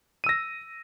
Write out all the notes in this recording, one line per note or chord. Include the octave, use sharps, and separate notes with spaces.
E6 A#6 D#7